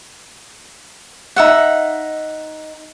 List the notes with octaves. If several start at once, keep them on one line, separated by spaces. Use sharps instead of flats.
D#4 E5 F#5